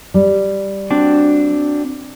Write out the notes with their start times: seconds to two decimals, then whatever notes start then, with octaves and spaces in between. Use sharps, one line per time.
0.14 G3
0.90 C4 D4 F#4